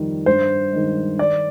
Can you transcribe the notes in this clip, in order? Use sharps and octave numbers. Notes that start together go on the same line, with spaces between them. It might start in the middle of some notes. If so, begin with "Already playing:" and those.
Already playing: F2 D#3 G3
G2 C5
D#3 G#3
D#3 D5